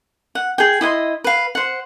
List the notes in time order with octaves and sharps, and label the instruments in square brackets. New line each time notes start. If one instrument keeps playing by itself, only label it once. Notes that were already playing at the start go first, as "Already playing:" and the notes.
[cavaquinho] F#5
G#4 G5
E4 D#5 F#5 C6
B4 F5
C5 F#5